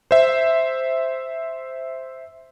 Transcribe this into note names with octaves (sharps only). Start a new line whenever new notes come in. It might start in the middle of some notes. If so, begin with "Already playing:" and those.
C5 E5